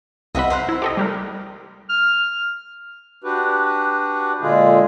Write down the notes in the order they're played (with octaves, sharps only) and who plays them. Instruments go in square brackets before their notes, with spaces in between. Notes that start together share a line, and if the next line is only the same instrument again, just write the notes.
[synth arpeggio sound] C2 C3 B5 [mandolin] D#5 E5 F#5
[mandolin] C5 A#5 F#6
[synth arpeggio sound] E4
G4 A4 D#5
G3 G4 A#4
[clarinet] F6
[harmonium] D4 F#4 G4 B4
A#2 D3 G#3 F4 G#4